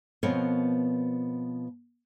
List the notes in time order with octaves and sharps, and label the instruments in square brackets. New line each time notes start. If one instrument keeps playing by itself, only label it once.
[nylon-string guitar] B2 F3 B3 C4 A#4 C#5